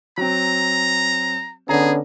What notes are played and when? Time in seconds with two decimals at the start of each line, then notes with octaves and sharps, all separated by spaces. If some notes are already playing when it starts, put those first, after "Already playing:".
0.18 F#3 C4 A#5
1.69 D3 B3 C#4 G#4 A#5